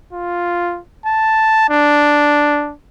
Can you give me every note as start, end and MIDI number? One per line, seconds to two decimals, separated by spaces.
0.13 0.79 65
1.06 1.66 81
1.70 2.72 62